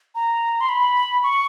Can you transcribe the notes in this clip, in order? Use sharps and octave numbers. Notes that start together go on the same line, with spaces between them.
A#5
C6
B5
C#6